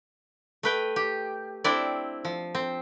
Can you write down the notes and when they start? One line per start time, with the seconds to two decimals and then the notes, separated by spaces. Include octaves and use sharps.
0.63 A3 B4 G5
0.96 G4
1.64 C4 D4 E4 D5
2.25 F3
2.55 C4